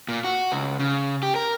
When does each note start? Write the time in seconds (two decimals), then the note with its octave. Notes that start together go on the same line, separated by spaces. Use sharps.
0.09 A#2
0.24 F#4
0.52 C#2
0.79 C#3
1.23 G4
1.35 A#4